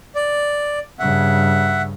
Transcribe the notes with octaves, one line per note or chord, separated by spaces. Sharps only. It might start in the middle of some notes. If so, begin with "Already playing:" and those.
D5
G2 C#3 E5 F#5